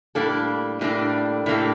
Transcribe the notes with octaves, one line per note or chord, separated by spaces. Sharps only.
A2 G3 A#3 D4 A4
A2 G3 A#3 D4 A4
A2 G3 A#3 D4 A4